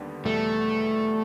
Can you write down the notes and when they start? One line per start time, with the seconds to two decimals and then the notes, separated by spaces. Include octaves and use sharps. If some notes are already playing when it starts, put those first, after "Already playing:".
Already playing: D#2 D3 G3 B3
0.25 E2 B2 G3 A3